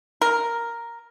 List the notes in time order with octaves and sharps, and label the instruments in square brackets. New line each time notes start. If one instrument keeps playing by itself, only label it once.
[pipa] A#4